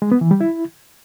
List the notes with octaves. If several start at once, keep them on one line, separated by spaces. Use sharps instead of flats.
G#3
B3
E3
G3
E4